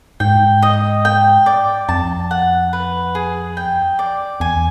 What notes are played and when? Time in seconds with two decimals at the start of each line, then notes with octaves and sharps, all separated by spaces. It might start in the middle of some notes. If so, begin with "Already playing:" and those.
0.20 G#2 G5
0.62 D#5
1.05 G5
1.46 D5
1.89 F2 A5
2.31 F#5
2.73 B4
3.15 G#4
3.57 G5
3.99 D5
4.40 E2 G#5